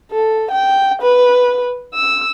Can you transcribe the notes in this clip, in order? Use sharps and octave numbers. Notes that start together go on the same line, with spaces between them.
A4
G5
B4
E6